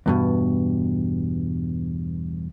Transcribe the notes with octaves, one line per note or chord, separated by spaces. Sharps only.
E2 G2 B2